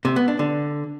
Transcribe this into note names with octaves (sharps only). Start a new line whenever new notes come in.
C3
B3
D4
D3